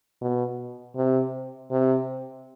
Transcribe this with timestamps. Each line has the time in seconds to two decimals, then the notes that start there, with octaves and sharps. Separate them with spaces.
0.21 B2
0.96 C3
1.71 C3